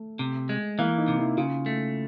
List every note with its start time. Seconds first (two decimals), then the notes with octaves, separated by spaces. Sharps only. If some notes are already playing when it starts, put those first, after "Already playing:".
Already playing: A3
0.19 C3
0.49 G#3
0.79 E3 A#3
0.98 D#4
1.08 C3
1.18 E4
1.37 C#3 F4
1.66 A3